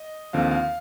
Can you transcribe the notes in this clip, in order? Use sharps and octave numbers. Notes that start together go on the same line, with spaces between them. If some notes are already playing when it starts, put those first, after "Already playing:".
Already playing: D#5
D#2 D3 F3 C4 F5
F5